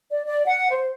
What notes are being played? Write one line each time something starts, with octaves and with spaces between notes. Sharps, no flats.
D5
D5
F#5
C5